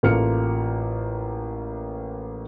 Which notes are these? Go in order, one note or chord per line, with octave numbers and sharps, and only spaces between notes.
A1 A#3 F4 A4 F6 C#7